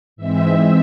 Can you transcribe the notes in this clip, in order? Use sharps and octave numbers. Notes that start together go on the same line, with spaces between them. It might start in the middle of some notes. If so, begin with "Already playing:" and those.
G#2 E3 G#3 C4 E5